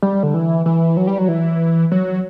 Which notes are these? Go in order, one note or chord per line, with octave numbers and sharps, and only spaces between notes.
G3
D3
E3
E3
F#3
G3
F#3
E3
F#3